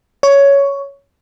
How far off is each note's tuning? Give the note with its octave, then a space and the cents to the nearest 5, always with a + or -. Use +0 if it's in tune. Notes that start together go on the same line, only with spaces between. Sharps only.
C#5 +10